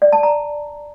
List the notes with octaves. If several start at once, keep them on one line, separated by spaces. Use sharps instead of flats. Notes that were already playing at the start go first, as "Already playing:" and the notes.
D5
A5
A#5